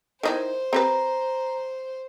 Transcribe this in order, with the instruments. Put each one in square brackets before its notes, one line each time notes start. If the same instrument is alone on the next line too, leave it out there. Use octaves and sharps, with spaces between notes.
[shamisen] D#3 D#4 E4 [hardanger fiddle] C5
[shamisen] C4 G4 B4 [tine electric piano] A#5